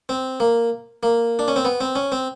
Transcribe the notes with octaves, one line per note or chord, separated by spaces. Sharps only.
C4
A#3
A#3
D4
C#4
C4
B3
C4
C#4
C4